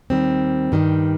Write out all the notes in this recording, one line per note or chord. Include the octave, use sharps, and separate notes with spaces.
D#2 D#3 G3 C4
G2 D#3 G3